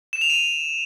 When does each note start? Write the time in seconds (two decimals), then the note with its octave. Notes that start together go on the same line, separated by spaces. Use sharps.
0.13 E7
0.21 F7
0.30 D#7